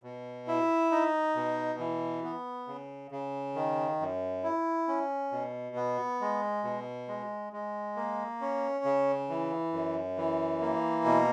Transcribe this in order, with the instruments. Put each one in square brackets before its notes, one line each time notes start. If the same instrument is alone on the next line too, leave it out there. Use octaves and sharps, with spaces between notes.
[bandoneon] B2
E4
D#4
B2
E3
B3
C#3
C#3
D#3
F#2
E4
C#4
B2
B3
G#3
B2
G#3
G#3
A#3
C#4
C#3
E3
F#2
E3
A#3
B2